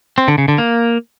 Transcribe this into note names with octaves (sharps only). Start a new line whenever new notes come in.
C4
D3
C#3
D3
A#3